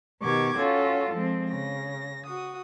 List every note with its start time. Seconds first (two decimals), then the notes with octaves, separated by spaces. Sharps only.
0.21 B2 D#3 G4 C#6 D6 G#6
0.57 C#4 F4 F#4 A4
1.12 F3 G#3 C4
1.49 C#3 A#6
2.25 F#4 D#6